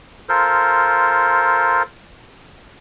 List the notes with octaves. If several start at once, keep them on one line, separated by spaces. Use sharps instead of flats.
F4 A4 A#4 C5